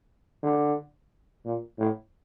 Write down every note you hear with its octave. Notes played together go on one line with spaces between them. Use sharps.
D3
A#2
A2